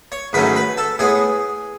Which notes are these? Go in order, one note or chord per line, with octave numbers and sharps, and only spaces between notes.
C#5 C#6
G#2 D#3 F#3 A3 C#4 B4 B5
B4 B5
A4 A5
A2 G#3 B3 G#4 G#5